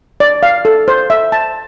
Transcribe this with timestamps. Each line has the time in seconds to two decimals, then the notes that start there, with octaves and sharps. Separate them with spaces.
0.20 D5
0.43 F5
0.65 A4
0.88 C5
1.10 E5
1.32 A5